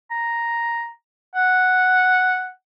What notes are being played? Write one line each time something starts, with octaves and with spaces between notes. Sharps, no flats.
A#5
F#5